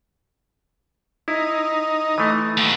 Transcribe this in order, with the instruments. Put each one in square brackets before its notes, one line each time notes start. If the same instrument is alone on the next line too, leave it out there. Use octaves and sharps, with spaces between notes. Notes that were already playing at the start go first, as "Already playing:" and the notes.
[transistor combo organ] D#4 [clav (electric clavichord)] E4
[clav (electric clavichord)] E3 A3
[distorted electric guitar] D#2 B2